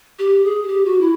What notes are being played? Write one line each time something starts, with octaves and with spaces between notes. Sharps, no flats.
G4
G#4
G#4
G4
F#4
E4